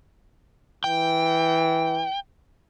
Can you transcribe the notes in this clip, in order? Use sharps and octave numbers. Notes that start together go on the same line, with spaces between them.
E3 G5